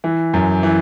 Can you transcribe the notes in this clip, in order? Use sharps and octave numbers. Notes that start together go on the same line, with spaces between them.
E3
F#2
E3